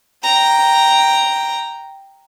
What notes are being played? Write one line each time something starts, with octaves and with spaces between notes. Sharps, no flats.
G5 A#5